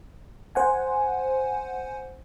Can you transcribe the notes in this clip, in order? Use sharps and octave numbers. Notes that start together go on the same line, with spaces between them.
C5 F#5 G#5